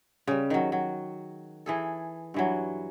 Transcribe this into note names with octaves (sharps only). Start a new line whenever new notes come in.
C#3 G3
D#3 F#3
F#3
E3 G#4 A4
G2 E3 F#3